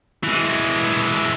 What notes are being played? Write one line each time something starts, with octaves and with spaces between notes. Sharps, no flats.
E3 G#3